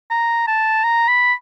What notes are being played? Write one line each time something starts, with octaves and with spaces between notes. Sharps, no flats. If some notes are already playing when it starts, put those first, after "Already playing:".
A#5
A5
A#5
B5